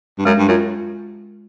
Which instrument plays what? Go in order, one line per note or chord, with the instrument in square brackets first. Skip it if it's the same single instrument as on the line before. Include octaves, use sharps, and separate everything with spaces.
[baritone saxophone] G2
[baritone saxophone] F#2 [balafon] G#3
[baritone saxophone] G2
[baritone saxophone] F#2 [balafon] F4